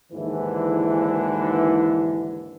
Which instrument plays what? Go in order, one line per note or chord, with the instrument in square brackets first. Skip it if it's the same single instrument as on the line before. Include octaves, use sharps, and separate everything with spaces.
[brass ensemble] D#2 G#2 D3 E3